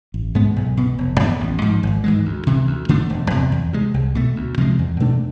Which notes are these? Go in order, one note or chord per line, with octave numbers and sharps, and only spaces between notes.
A1
G#2 G#3 B3
B1
B2 B3
F1
F2 E3 B3
A1
G#2 F3
G#1
G#2 E3 G#3
D2
C3 E3
D2
D3 A3 D4
E1
E2 C3
E2
C3 G#3
C2
B2 A3
D2
C3 F3 G#3
E2
B2 A3 D4